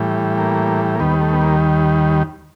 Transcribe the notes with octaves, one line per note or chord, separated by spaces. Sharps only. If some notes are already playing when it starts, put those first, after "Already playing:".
Already playing: A2 E3 G3
A#3
A#3
D#2 D#3 G3 B3
A3
B3
A#3